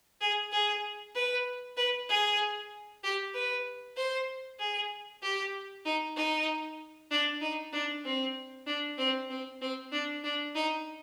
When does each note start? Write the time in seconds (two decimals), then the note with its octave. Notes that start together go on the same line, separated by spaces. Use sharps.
0.21 G#4
0.52 G#4
1.15 B4
1.77 B4
2.09 G#4
3.03 G4
3.34 B4
3.97 C5
4.59 G#4
5.23 G4
5.86 D#4
6.16 D#4
7.11 D4
7.42 D#4
7.73 D4
8.05 C4
8.67 D4
8.98 C4
9.30 C4
9.61 C4
9.92 D4
10.24 D4
10.55 D#4